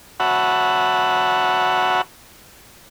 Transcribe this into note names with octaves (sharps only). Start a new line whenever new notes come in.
F#4 C#5 E5 F#5 A5 B5